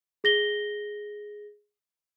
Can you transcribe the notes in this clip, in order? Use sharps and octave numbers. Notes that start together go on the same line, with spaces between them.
G#4 A#6 G7